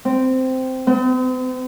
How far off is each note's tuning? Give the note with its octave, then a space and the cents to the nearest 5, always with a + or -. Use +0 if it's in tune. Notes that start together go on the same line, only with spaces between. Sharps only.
C4 -10
C4 -45